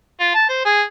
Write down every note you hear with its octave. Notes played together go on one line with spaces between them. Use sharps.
F4
A5
C5
G#4